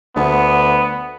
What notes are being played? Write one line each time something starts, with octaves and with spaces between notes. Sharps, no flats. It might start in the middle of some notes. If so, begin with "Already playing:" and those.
D2 B3